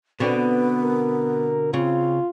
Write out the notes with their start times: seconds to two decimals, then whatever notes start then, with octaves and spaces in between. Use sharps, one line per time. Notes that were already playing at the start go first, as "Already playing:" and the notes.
0.20 B2 D3 B3 C4 B4
0.82 A#4
1.74 C#3 C4 F4